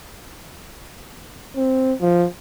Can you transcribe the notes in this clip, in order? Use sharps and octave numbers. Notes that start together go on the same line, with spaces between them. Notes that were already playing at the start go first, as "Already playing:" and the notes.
C4
F3